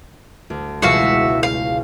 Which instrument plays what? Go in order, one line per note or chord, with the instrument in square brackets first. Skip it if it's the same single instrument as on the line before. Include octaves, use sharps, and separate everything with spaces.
[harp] D2
[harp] E1 C#2 [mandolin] F#4 E5 F5
[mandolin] F5